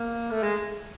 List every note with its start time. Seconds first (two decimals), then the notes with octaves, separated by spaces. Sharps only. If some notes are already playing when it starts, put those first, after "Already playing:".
Already playing: A#3
0.31 A3
0.43 G#3